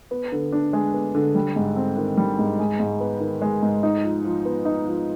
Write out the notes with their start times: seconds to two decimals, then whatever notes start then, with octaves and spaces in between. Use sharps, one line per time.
0.11 B3
0.32 D3
0.52 D4
0.73 G#3
0.94 B3
1.15 D3
1.35 G3
1.56 G#2
1.76 C4
1.97 D#3
2.17 G3
2.39 G#2
2.59 G#3
2.80 G#2
3.00 B3
3.21 D#3
3.42 G#3
3.62 G#2
3.83 D#4
4.03 F3
4.24 F3
4.45 B3
4.65 D#4
4.86 F3